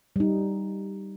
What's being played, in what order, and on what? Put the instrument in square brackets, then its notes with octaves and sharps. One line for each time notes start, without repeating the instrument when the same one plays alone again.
[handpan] G3 D#4